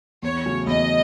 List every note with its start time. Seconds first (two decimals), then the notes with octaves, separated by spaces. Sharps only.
0.23 E2 C#5
0.46 C#3 F#3 A3 C#4
0.67 E2 D#5